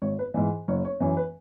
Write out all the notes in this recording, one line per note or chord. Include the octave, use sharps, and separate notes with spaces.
G#1 C#5
B4
G#2 E3
F#1 C#5
C#5
F#2 E3 C#5
B4